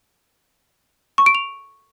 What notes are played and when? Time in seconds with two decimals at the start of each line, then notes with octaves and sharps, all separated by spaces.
1.18 C#6
1.26 D7
1.35 F7